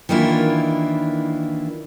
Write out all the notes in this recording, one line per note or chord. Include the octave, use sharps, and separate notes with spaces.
D#3 E3 A#3 D4 E4 F4